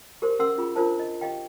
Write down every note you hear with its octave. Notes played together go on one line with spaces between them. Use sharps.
G4 A#4 C5 C6
C#4 A#4 F#5 C6 E6
C#4 F4 G#4 B5
D4 F4 A#4 C5 E5 A5
D#5
G4 D#5 F5 G5